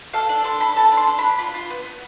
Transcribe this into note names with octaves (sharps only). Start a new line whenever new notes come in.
A4 F5
D4
A4 C6
A4 B5
A4 A5
D4
C6
D4
B5
D4
F4 B5
F4
B3
B3